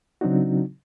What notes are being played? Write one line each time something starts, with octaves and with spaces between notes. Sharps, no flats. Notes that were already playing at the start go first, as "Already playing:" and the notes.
C#3 F#3 C4 D4 D#4 F#4